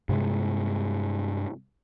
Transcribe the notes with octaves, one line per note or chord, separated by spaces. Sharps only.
G2 C3 G#3